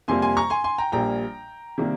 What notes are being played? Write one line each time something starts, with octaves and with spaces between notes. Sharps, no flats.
F2 C3 G3 A#3 G#5 C6
G#5 C6
A#5 C#6
G#5 C6
G#5 C6
G5 A#5
A#1 A#2 G3 A#3 G5 A#5
C3 D#3 G3 A#3